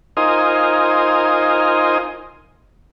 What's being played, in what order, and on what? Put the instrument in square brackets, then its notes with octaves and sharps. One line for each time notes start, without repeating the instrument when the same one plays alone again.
[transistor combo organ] D#4 F4 A#4 C5 D#5 G#5